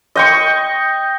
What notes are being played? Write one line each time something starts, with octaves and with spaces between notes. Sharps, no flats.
D#5 G5 C#6